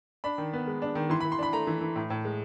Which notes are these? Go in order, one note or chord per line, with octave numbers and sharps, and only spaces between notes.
D4 B5
D#3
B3
G#3
D4
D#3
E3 C6
B5
E3
C6
D4 B5
A3 A#5
E3
E3
A2
A2
G#3